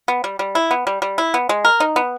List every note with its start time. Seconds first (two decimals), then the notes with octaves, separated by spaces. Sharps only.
0.08 B3
0.24 G3
0.39 G3
0.55 E4
0.71 B3
0.87 G3
1.02 G3
1.18 E4
1.34 B3
1.49 G#3
1.65 A#4
1.80 D#4
1.96 B3